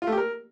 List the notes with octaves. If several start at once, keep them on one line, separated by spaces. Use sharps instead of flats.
F4
A3
G4
A#4